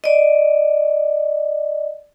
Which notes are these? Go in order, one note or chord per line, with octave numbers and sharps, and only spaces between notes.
D5 D#5